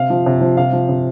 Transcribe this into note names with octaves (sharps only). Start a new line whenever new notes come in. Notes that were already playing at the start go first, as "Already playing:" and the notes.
Already playing: C3 F5
F3
C3
F3
C3 F5
F3
C3